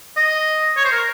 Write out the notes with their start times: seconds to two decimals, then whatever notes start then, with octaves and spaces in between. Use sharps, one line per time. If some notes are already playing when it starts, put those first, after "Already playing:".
0.17 D#5
0.77 C#5
0.85 C5
0.92 A#4